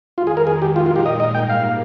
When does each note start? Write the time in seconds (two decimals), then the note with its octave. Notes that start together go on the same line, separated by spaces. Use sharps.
0.17 F2 D#3 G#3 F4
0.27 G#4
0.37 A#4
0.47 G#4
0.62 G4
0.76 A#2 G#3 D#4 F4 A#4
0.86 F4
0.96 G4
1.06 D#5
1.20 D#5
1.35 G#2 G3 A#3 G5
1.50 F5